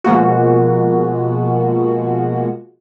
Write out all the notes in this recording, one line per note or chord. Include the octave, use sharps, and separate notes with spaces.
B2 F3 G#3 A#3 F4 F#4